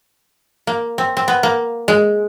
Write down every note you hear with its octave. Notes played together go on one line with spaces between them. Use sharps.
A#3
C4
C4
B3
A#3
G#3